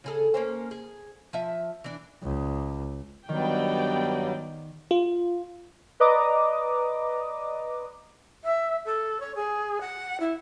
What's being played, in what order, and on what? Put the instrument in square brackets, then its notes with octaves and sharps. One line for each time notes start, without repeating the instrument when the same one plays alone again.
[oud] C#3 G#4 A4
A#3 C#4 C5
G#4
F3 E5
E3 D4
[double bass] C#2
[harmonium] G2 F#3 G3 [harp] D#3 [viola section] B3 D5 G5
[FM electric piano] F4
[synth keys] B4 D5 D#5 A#5 D6 D#6
[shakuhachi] E5
A4
C#5
G#4
F#5
E4